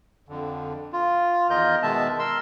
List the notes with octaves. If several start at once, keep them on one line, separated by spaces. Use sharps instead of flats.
F2 D3
F4
E2 D#3 F4 A#4 D#5 G6
B2 D#3 G#3 B3 E5 A5
A#4 C6 E6